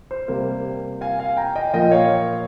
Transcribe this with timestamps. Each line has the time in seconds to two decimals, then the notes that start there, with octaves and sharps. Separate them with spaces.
0.11 C5
0.28 C3 G3 A#3
1.01 F5 G#5
1.19 F5 G#5
1.37 G5 A#5
1.55 D#5 G5
1.73 A#2 F3 A#3 D#5 G5
1.91 C#5 F5